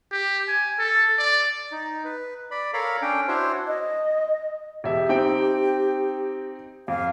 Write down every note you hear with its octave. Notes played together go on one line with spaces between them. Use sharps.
G4
G#5
A4
D5
D#4
B4
D5 B5
A4 A#4 C#5 F5 A#5 B5
C#4 D4 G5
D4 E4 F#4 C5 C#5
D#5
E1 G4 E5
C4 D#4 G5
F2 F5